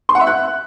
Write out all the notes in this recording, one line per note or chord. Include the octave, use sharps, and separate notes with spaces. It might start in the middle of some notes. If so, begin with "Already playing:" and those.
C6
F#5
E5
F#6